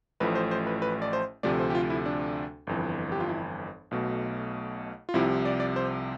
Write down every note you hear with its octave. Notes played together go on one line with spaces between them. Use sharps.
A1 A2 F3 A3 B4
C5
C5
B4
B4
D5
C5
D2 C3 F3 A3 D5
C5
G4
F4
E4
D4
G1 F2 E3
G4
F4
E4
B1 B2 A3
F4
C2 C3 F3 E4
D5
D5
C5